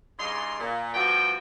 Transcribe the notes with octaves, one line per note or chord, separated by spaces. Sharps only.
G2 C#3 D#4 C6
A#2
G2 F3 B3 F#4 G5